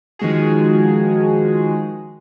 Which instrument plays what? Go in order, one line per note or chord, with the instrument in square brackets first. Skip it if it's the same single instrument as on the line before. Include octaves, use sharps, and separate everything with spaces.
[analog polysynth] D#3 F3 G#3 F#4 G#4